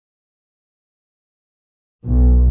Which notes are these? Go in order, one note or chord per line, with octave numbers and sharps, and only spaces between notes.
B1